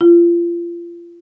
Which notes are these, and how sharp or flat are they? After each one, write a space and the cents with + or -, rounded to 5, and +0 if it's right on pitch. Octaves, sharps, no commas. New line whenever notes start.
F4 -30